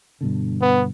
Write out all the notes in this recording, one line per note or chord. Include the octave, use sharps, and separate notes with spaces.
G2 B2 D3
B3